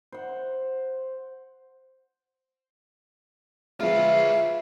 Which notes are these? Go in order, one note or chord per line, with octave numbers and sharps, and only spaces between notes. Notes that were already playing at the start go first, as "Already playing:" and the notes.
C5 F#5
F3 G#3 F4 B4 E5 F5